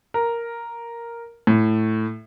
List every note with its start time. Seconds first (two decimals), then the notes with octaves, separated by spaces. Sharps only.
0.14 A#4
1.47 A2